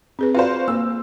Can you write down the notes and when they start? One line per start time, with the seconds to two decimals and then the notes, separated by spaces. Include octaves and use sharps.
0.19 C4 G#4 B4
0.35 F4 F#4 B4 C5 D5
0.68 A#3 E6